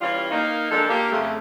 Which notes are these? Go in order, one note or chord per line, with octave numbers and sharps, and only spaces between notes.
E3 G3 C#4 F4
A#3 D#4
F3 G#3 A#3 D4 A4
A#3 G4
F2 C#3 A3